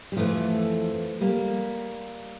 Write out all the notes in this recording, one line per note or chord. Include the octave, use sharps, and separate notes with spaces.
G3
F2 E3 F3 A3
G3 A#3